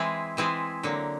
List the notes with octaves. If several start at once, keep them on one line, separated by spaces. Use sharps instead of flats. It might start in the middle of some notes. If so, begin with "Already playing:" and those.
Already playing: E3 G#3 C4 E4 G#4
E3 G#3 C4 E4 G#4
D3 F#3 A#3